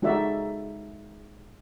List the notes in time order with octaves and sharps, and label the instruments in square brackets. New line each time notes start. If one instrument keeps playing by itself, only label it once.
[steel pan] G#3 D#4 F#4 D5 E5